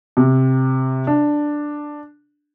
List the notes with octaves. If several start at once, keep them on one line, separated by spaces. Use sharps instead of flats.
C3
D4